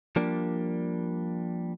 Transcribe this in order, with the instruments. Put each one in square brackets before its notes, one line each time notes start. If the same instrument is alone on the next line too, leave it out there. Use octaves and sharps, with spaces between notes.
[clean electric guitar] F3 G3 A#3 D4